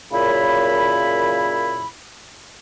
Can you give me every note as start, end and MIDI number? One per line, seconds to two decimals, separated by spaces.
0.12 1.88 42
0.12 1.88 46
0.12 1.88 49
0.12 1.88 64
0.12 1.88 83